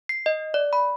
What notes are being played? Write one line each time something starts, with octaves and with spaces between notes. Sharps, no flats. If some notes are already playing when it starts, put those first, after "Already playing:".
C7
D#5
D5
B5